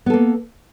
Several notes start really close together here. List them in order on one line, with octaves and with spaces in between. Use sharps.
B3 A4 A#3